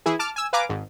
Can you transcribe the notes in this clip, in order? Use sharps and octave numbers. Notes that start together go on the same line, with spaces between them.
E3 E4 G#4
A5 D6 F6
G#5 E6
B4 F5 G#5 A#5 D6
G#1 G#2